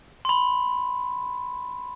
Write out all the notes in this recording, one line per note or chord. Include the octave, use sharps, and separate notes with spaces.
B5 C6